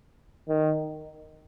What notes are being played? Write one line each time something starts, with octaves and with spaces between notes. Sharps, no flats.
D#3